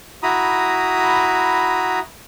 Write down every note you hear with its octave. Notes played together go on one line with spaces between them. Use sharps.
E4 F#4 A#5 B5 D#6